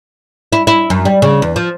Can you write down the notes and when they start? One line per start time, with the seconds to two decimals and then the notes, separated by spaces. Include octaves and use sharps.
0.52 E4
0.67 E4
0.90 F#2
1.05 G3
1.22 C#3
1.42 E2
1.56 F3